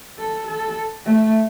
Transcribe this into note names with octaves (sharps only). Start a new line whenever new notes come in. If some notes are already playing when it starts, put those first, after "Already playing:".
A4
A4
A3